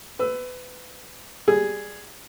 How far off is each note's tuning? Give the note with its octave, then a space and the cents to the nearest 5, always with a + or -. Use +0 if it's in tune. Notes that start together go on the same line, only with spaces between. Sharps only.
B4 +25 E6 +0
G3 +0 G#4 +0